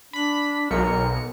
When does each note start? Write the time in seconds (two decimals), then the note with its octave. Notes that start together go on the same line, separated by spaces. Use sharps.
0.13 D4 B5 B6
0.71 B1 A#4 C#7